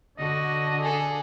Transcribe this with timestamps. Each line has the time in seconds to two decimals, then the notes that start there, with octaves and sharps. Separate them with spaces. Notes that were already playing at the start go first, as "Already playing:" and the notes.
0.19 D3 D4 F#4 D#5
0.82 G#4 A4